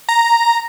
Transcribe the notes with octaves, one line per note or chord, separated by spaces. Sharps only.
A#5